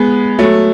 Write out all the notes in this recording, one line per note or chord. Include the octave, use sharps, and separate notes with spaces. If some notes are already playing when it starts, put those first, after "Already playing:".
Already playing: G#3 B3
F#3 A3